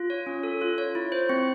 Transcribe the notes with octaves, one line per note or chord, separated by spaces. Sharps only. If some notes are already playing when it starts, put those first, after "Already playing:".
Already playing: F4
C#5
C#4
A4
F4
C#5
E4
C5
C4